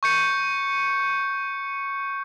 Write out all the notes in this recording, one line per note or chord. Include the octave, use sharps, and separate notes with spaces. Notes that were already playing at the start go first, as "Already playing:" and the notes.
C#6 G6 C#7